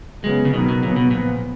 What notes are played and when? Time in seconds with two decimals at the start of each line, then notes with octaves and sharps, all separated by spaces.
0.24 C#3 F#3 G#3 B3
0.45 C#3
0.53 B2 D#3 F#3 B3
0.68 B2
0.82 A#2 C#3 F#3 B3
0.96 B2
1.11 A#2 F3 B3